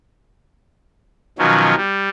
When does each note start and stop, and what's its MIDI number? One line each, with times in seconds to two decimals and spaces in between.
1.39 1.74 47
1.39 1.74 51
1.39 1.74 53
1.39 1.74 54
1.39 1.74 61
1.76 2.09 55